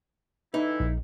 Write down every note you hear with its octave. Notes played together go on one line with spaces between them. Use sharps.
D3 E3 D#4 E4
A#1